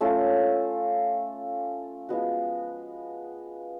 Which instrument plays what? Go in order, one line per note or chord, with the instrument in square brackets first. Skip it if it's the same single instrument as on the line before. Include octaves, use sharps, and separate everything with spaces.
[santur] A3 C#4 F4 A4
F3 G#3 B3 F#4